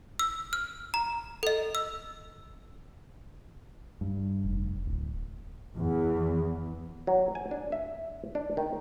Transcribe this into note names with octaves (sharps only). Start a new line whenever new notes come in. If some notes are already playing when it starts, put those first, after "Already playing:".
E6
F6
A#5
A4 D#5
E6
G2
F1
D1
E2
F#3
G#5
D4
E5
D4
D#3